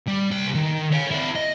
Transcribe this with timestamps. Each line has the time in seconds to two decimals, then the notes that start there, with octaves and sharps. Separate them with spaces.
0.08 G3
0.31 C2 G5
0.55 D#3
0.92 C#5 F5
1.11 E4 D5
1.36 D#5